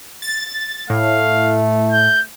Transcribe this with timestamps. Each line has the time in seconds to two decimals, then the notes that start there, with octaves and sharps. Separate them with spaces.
0.22 A6
0.90 A2 A3 F5
1.92 G6